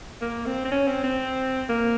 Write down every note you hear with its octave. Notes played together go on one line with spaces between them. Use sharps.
A#3
C4
C4
C#4
C4
C4
A#3